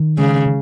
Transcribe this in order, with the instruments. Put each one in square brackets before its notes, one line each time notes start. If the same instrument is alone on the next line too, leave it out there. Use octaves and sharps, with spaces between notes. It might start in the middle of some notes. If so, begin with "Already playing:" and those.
Already playing: [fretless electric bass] D#3
[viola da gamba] C#3 [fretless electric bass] G#3
[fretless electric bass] C#3